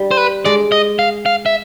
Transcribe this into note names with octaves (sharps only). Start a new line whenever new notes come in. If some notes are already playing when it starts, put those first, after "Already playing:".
Already playing: G3
C5
B4
G#3 D5
D#5
F5
F5
E5